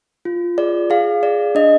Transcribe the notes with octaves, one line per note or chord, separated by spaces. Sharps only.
F4
G#4 D5
G#4 F5
G#4 D5
D4 D#5